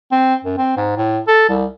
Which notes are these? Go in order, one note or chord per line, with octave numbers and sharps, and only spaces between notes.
C4
F#2
C4
G#2
A2
A4
C2